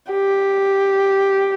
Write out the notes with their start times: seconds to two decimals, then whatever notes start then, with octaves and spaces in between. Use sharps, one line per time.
0.11 G4